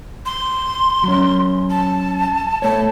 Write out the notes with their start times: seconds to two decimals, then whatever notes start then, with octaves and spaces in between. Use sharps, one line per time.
0.26 C6
1.03 F#3 C#4
1.70 A5
2.62 A3 C#5 A5